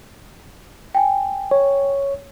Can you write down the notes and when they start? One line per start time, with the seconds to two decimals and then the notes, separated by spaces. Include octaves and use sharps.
0.95 G5 G#5
1.51 C#5